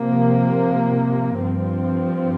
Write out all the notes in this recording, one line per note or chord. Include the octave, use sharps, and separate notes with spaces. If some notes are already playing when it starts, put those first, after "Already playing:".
Already playing: C3 F3 A#3
G2 F3 C4